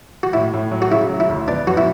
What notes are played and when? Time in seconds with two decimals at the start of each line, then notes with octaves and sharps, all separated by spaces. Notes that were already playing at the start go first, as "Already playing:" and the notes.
0.23 F#4
0.33 A2 E4
0.53 A2
0.71 F#3
0.82 F#4
0.91 C#3 E4
1.10 F#3
1.20 E4
1.29 D2
1.48 B3 D4
1.67 F#2 F#4
1.77 E4